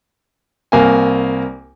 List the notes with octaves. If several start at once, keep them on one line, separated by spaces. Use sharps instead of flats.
C2 A#3 G#5